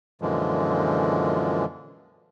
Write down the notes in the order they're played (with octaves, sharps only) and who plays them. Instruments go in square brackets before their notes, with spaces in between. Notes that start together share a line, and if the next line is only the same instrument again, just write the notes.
[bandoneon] F#2 A#2 D3 E3 F3 G#3